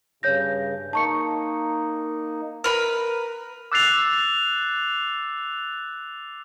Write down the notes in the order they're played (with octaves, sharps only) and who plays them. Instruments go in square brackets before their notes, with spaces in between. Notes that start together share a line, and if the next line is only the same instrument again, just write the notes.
[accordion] G2 C#3 [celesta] C#5 G6 A#6
[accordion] A#3 D#4 [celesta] A5 C#6 C#7
[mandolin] A#4 B4 B5
[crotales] D6 E6 F#6 A6 C7 F7